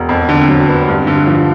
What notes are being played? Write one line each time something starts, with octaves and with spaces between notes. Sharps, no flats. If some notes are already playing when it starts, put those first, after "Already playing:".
Already playing: E1
F2
D3
F#3
B3
G2
D3
F3